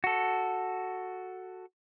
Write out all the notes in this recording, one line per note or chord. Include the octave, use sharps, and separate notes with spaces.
F#4 A4